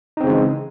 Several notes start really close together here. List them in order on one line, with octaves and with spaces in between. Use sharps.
D#4 C4 C#3 G#3 E3